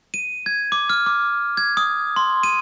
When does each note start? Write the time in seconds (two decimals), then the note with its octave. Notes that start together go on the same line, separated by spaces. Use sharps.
0.14 D#7
0.46 G#6
0.72 D6
0.90 F6
1.06 D6
1.57 G#6
1.77 D#6
2.16 C6
2.43 D#7